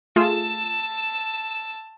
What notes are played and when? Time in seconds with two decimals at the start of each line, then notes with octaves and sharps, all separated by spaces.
0.16 A3 F4 G#4 A5 E6